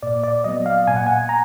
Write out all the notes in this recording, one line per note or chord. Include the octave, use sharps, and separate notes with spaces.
A#2 D5
D5
F#3 B3 D#5
F5
A#2 G#5
F#5
G#5
A#5